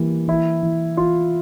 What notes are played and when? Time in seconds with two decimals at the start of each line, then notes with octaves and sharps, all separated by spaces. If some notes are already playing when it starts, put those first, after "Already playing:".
Already playing: E3 G3 A#3
0.28 E3 E4
0.63 E3
0.97 E3 F4